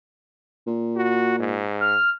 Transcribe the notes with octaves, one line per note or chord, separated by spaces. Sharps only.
A#2
F#4
G#2
F6